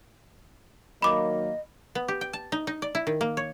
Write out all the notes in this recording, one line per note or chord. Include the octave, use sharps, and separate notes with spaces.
D#3 F#3 A#3 D#5 B5 D6
B3
G4
G5
A5
D#4
D#4
D5
E4
D#3
A#3
C#5